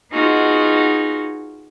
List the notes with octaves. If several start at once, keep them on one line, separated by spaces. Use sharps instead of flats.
B3 D#4 F4 F#4 G#4